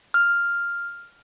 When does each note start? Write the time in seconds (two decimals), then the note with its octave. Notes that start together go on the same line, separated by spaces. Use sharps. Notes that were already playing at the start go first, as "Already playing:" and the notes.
0.14 F6